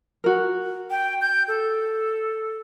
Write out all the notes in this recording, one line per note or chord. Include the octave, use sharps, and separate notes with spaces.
F#4 A#4
G5
G6
A4